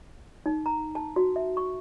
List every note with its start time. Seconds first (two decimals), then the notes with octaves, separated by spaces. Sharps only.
0.46 D#4
0.66 A#5
0.95 A5
1.16 F#4
1.36 E5
1.57 C#6